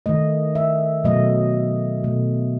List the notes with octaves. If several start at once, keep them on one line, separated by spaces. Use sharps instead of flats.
D#3 A3 D#5
E5
B2 F#3 A3 D#5
B2 A3